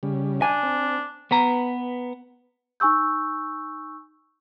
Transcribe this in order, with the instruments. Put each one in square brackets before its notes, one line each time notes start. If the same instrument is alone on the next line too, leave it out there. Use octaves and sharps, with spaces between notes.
[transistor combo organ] C#3 G3
[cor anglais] D4 [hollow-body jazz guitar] G#5
[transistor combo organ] C4
[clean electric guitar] B3 B4 A#5
[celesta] D#4 G#5 C#6 E6 G6